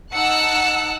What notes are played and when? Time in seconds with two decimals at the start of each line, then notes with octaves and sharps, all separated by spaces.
0.14 D#4 F#5 A5 E6 F#6 C#7